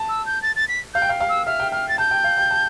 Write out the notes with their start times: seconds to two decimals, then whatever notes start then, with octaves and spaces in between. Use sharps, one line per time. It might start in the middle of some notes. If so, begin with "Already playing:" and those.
Already playing: A5
0.09 E6
0.26 G6
0.42 A6
0.56 A6
0.68 B6
0.94 F5 G6
1.02 G5
1.09 F5
1.20 F5
1.29 E6
1.46 E5 F6
1.60 G5
1.72 G5 F6
1.89 A6
1.98 A5 G6
2.11 G5
2.24 F5
2.37 G5
2.51 A5